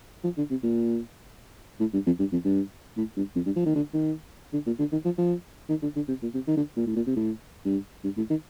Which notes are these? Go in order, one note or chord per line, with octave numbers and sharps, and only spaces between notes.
F3
D3
C3
A#2
A2
G2
F2
G2
F2
G2
A2
G2
F2
G2
F3
D#3
D3
D#3
D3
A#2
D3
D#3
F3
F3
D#3
D3
D3
C3
A#2
C3
D#3
D3
A#2
A2
A#2
C3
A2
G2
G2
A2
D#3